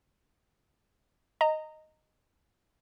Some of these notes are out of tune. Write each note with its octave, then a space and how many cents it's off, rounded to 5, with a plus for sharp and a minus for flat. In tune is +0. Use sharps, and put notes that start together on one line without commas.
D#5 +0 A#5 -20